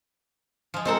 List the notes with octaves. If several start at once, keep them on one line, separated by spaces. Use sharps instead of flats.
F3 G#3
G#3 C4 A4 A#4 F#5 A#5